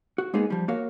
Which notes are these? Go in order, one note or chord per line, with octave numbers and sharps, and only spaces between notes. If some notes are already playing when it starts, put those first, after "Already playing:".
F#4
G#3 A#3 B3 D#4 G#4
F3 G3
A#3 F#4 A#4 C#5 F5